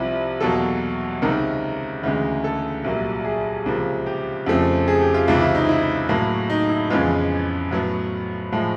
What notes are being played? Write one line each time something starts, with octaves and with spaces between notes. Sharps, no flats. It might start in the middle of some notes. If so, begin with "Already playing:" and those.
Already playing: C2 C3 F3 E4
E2 B2 F#3 A#3 A4
C#2 C3 D#3 A#4
D2 C#3 E3 G#3
A4
C2 A#2 F#3 A#3
G#4
C#2 C3 F3 A#3
G4
F2 C#3 F3 A3 C4
G#4
G4
F4
C#2 C3 E3 F4
E4
D#4
E4
A2 F#3 A#3
D#4
E4
F2 C#3 E3 G#3 B3 F4
A2 F#3 B3
A2 F3 G#3